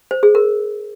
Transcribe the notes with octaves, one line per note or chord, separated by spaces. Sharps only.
C5
G#4
A#4